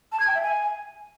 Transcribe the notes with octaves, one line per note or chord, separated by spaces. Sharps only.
A5
G#6
G5
E5
G#5